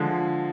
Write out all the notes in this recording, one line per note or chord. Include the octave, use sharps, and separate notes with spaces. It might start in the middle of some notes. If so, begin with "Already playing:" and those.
Already playing: D3 F3 G#3